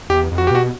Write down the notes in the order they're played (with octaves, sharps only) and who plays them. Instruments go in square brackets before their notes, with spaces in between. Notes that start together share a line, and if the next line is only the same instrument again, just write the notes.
[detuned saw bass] E2 [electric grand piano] G4
[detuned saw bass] F2
[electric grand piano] F#4
G4
[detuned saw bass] B2 [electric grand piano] F#4